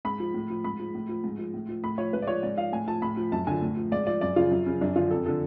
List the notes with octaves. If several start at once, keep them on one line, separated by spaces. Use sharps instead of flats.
G#2 B5
F3
A2
F3
G#2 B5
F3
A2
F3
G#2
F3
A2
F3
A2 B5
F3 C#5
G#2 B4
D5
F3 C#5
G#2 D5
F3 F5
A2 G#5
F3 A5
A2 B5
F3
F#2 A5
D3 F3 G#5
A2
F3
G#2 D5
F3 D5
F#2 D5
C#3 F3 F4
F#2
C#3 F3
F#2 D4
D3 F3 F4
F2 A4
D3 F3 A4